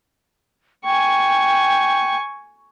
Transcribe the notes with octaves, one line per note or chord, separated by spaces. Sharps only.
G5 G#5 C#6